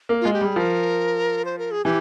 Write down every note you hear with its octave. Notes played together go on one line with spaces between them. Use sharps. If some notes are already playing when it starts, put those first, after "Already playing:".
A#3
G#3 F4
G4
G3 G#4
F3 A#4
C5
A#4
G#4
E3 G4